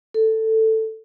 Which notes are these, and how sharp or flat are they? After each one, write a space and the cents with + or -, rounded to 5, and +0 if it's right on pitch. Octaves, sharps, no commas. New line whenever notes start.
A4 +10